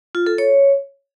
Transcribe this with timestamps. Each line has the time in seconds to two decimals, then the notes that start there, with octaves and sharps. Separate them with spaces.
0.15 F4
0.27 A4
0.38 C#5